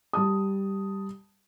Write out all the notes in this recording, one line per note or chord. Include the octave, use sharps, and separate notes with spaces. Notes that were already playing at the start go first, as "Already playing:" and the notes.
G3 A5 D#6